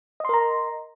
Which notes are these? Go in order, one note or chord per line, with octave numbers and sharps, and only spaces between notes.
A#4 D#5 A#5 C6